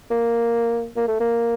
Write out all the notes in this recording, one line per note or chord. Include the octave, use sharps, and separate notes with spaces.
A#3
A#3
A3
A#3